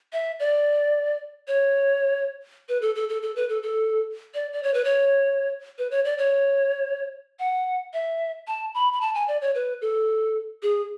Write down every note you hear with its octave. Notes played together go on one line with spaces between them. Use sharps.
E5
D5
C#5
B4
A4
A4
A4
A4
B4
A4
A4
D5
D5
C#5
B4
C#5
B4
C#5
D5
C#5
F#5
E5
A5
B5
B5
A5
G#5
D5
C#5
B4
A4
G#4